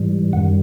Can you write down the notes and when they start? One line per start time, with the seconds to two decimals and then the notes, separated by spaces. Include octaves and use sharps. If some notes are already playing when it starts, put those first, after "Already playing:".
Already playing: G#2 E3 G3
0.33 F#2 D#3 G3 F#5